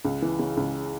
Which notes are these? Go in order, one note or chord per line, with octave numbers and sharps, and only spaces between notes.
C#2
E3
C#3
C#2